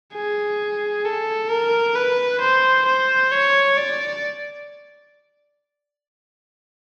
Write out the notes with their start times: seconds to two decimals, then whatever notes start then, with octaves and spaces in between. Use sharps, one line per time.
0.14 G#4
1.05 A4
1.50 A#4
1.95 B4
2.41 C5
2.87 C5
3.32 C#5
3.77 D5